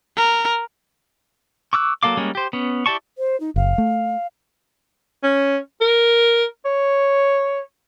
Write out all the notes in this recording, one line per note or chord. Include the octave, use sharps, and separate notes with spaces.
A#4
C#6 D6 E6 F#6
F#3 A#3 A4 F5 D6
G3 G#3 A#3 C#4
G4 C5
B3 C#4
E4 G4 D5 A5 C#6
C5
D#4
F#1 F5
A3
C#4
A#4
C#5